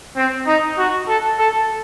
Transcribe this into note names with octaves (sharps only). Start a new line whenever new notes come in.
C4
D#4
F#4
A4
A4